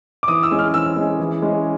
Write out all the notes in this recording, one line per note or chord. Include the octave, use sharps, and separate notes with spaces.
D6
E3 D#6
E6
G#3 C#4
F6
E3 E6
G#3 C#4
E3
G#3 C#4